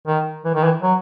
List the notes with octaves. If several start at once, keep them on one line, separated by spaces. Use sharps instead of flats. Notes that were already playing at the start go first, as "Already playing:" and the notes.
D#3
E3
D#3
E3
F#3